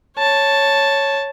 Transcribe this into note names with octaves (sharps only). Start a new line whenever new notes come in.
C#5 A5